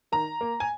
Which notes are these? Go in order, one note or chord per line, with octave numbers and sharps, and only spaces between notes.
D#3 A#5
A#3
G#5